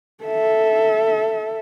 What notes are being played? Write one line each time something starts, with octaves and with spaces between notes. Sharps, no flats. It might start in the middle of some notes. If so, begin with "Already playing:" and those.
A4 E5